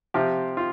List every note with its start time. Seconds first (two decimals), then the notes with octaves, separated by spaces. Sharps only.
0.14 C3 F3 C4 F4 G4
0.57 F4